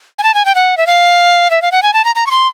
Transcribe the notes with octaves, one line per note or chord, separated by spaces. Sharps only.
G#5
A5
G#5
G5
F#5
E5
F5
E5
F5
F#5
G#5
A5
A#5
A#5
C#6
C6